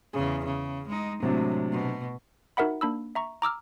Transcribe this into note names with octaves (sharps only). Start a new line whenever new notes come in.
E2 C#3 G#4
C#3
G#3 D#4
A2 C3 F#3 G#3 D4
B2
D#4 F#4 A#4 E5 F#5 B5
A#3 D4 B5 E6
E5 A#5 C#6
A#5 D6 E6 F6